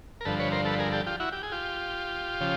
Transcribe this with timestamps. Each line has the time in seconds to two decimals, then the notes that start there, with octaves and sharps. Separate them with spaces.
0.21 A#4
0.25 G2 D3 F3 A4 B4
0.40 B4 C#5
0.52 A#4 C5
0.65 A4 B4
0.79 G#4 A#4
0.92 G4 A4
1.06 F4 G4
1.20 E4 F#4
1.32 G4
1.43 G#4
1.52 F4 G4
2.41 C#3 F3